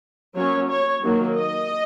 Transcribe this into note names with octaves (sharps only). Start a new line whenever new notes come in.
F#3 A#3 C#4 C#5
C#5
D#3 F#3 A#3
D#5